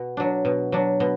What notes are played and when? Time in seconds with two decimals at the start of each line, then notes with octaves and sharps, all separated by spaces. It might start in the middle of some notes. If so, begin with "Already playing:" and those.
Already playing: B2
0.17 F#3 D4
0.45 B2
0.72 F#3 D4
1.00 B2